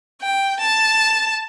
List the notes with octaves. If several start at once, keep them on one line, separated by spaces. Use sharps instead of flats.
G5
A5